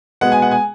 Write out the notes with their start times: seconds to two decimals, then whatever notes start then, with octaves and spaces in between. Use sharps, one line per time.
0.21 B2 G#3 B3 F#5
0.32 G#5
0.42 F#5
0.51 G#5